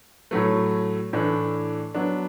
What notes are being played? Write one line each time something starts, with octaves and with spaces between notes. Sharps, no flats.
A2 F#3 A3
A2 E3 A3 D4
F#3 B3 D4